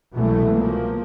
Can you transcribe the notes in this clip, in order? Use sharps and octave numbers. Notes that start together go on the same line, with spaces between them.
C2 B2 E3 F#3 G#3 A3
F3 A#3